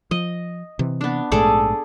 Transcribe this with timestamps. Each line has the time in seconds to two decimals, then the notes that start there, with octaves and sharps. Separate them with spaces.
0.11 F3 D#5
0.79 C3 E3
1.01 B3 D4
1.32 A#1 G#2 A3 G#4 A4 D5